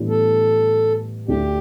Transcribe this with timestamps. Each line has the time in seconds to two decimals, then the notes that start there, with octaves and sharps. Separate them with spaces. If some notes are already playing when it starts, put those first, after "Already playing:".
Already playing: A2 E3 G3 B3 D4
0.09 A4
1.28 D2 D3 A3 D4 G4